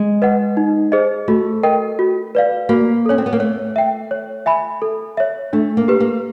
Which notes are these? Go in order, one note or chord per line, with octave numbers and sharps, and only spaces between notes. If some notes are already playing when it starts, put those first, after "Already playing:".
Already playing: G#3
B4 D#5 F#5
D#4
G#4 C5 D#5
A3 F#4
A#4 D#5 G5
F#4
B4 D5 F5
A#3 F#4
C#4 A4 C#5
C4
B3
A#3
A3 C#5
E5 G5
C#5
E5 G#5 B5
A4
C#5 E5
A3 D4
A#3
G4 B4
A#3